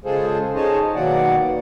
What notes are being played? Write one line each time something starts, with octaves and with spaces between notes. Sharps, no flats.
C#3 G#3 F4 G#4 A4 C5
D#4 G#4 C5 C#5 D#5 A5
B2 D#3 F#3 A#3 D5 F#5